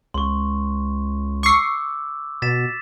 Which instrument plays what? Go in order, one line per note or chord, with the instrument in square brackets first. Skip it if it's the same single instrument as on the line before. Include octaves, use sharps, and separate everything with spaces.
[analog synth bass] C#2 [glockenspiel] C6 C#6
[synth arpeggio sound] C#6 C7 [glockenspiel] D6 E6
[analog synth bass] B2 [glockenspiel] A6 B6 E7